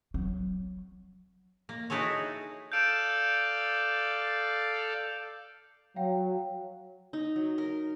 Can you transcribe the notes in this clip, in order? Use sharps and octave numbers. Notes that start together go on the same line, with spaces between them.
F#3
A#3
D#4 E4 F#4 G#4 A4 C#5
A4 D5 F5 G6 D7 E7
F#3 F5 G5
D#4
F#3
A#4